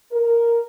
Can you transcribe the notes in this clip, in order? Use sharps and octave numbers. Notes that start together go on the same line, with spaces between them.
A#4